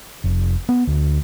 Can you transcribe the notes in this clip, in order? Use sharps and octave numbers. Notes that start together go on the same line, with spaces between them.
F1
B3
D2